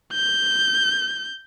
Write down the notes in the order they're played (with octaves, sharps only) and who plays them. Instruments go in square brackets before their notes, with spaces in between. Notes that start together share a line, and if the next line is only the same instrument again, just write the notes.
[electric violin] G6